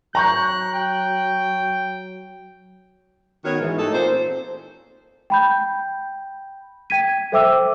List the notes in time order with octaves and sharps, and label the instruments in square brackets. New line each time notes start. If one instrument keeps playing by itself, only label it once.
[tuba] F#3 [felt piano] A#5 C#6 G6 [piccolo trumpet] F#6
[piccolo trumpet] G5
[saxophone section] D#3 B3 F#4 C#5
G#2 E3
A3 D#4 G4 A4
A#2 C5
[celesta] G5 B5 G6
G5 G#6 B6 D#7
A4 C5 E5 G5 D6 E6